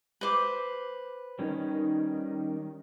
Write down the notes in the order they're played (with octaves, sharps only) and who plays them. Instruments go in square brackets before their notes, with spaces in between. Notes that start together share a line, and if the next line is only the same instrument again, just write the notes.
[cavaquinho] B4 C5 D6
[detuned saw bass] D#3 [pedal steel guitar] G3 C#4 D#4